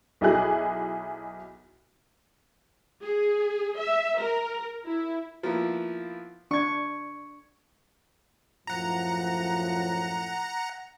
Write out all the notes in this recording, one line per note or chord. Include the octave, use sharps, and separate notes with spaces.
B1 D#4 E4 F#4 G#4 F#6
G#4
E5
A#4
E4
F3 A#3 B3 E4
D4 C#6 G#6
F#2 A2 F3 F#5 A#5